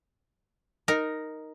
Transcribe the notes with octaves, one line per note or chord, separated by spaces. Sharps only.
D#4 A#4